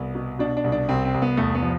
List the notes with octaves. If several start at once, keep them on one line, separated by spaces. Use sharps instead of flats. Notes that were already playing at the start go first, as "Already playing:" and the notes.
Already playing: C2 B3
B2
B2 D4
D4
C2
D4
C2 C4
C4
C2
B3
E2 A3
B3
F3